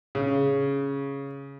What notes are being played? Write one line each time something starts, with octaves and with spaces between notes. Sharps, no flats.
C#3